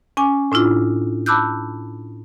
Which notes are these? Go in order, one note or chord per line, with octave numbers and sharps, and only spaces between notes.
C#4 G#5 D6
A2 D4 E4 F4
A5 B5 D6 E6 F#6 G6